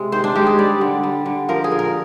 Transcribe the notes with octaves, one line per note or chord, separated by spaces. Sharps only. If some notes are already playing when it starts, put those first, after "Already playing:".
Already playing: C3 G#3
D#3 C5
D4
G#3 G4
G#4
G3 D5
D3
G3
D3
F3 A#4
G#4
A#2
A#4